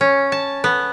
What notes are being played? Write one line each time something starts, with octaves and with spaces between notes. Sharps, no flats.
C#4
A5
B3